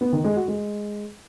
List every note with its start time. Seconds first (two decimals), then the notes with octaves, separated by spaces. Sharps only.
0.01 B3
0.13 D#3
0.24 G#3
0.36 F#4
0.48 G#3